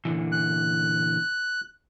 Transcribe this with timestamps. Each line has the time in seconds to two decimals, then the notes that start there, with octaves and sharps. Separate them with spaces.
0.05 A#2 D3 E3
0.32 F#6